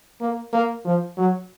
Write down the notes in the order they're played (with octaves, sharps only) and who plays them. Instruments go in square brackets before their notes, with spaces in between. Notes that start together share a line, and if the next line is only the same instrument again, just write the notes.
[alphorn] A#3
A#3
F3
F#3